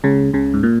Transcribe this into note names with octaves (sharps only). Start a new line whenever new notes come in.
C#2 C#3
C#2 C#3
G#2
A#2